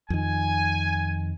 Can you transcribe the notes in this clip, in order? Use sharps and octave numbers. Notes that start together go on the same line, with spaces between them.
F2 D#3 G#5